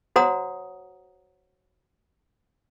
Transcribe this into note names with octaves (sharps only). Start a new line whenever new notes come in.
F#4 C5 C#5 F#5 A#5 D#6